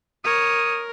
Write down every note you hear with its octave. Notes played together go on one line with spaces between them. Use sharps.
A#4 C#5 D#6